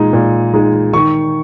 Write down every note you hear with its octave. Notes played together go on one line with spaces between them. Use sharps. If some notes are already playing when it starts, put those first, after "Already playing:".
Already playing: A#2 G#3 D#4
A#2
G#3 D#4
D#3 C#6